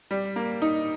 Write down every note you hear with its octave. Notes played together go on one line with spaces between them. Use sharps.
G3
A#3
D#4